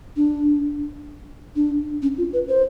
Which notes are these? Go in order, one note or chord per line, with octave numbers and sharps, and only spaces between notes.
D4
D4
C#4
F4
B4
C5